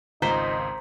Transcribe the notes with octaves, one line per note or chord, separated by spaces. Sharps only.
G#1 C#2 D#4 F4 C5 A#5 B6